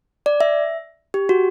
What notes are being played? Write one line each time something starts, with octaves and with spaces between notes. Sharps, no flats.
D5
E5
G4
F#4